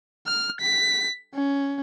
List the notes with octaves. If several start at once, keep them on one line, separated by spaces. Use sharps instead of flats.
F6
B6
C#4